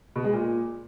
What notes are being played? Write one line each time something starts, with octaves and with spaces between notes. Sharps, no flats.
B2
G#3
A#2